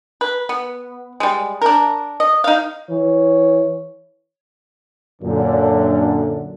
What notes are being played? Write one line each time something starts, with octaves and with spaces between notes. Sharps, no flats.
B4
B3
G3 G#3
D4 A#4
D#5
D#4 F5
E3 C#5
F#2 A#2 D3